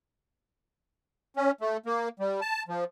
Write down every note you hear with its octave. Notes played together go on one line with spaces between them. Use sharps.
C#4
A3
A#3
G3
A5
F3